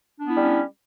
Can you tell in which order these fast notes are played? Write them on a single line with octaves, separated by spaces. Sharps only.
D4 B3 E4 G3 C#4